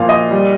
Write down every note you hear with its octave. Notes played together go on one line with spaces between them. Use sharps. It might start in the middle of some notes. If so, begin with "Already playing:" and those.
Already playing: A#2 F3 F5
D#5
G3